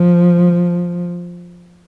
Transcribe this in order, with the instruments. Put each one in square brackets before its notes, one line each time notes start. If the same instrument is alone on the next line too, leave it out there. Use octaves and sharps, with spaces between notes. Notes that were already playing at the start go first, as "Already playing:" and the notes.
Already playing: [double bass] F3